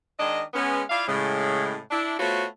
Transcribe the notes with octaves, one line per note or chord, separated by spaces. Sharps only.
D#3 G#3 D4 D#5
G#3 B3 C#4
E4 F4 D5 F5
A2 C#3 G#3
D4 E4
A3 B3 F4 F#4 C5 C#5